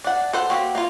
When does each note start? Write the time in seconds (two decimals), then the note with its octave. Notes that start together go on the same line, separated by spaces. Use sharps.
0.04 D4 F#5
0.33 A4 C5 F#5
0.50 A#3 C4 F#4 G4
0.75 A#3 F4